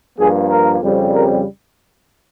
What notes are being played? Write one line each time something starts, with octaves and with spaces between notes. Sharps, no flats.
G2 F3 A#3 G#4
A#4
F2 C#3 G3 C4
A#4